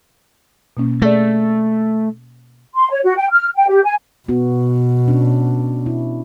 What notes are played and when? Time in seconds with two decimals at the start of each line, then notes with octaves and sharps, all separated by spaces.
0.77 B2 A#3 C#4
1.02 A3 G#4 D5
2.74 C6
2.90 C#5
3.03 F#4
3.16 G5
3.32 F6
3.55 G5
3.68 G4
3.84 G#5
4.29 B2 B3 F#4
5.08 C#4 D4
5.86 E4